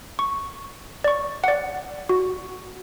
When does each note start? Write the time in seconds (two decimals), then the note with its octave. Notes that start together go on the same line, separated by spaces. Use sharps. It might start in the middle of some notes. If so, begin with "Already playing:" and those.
0.19 C#6
1.04 D5 C#6
1.44 D5 F#5
2.09 F#4